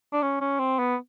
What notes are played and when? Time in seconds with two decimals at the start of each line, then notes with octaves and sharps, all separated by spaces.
0.12 D4
0.22 C#4
0.41 C#4
0.59 C4
0.79 B3